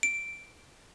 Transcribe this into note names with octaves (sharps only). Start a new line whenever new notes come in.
D7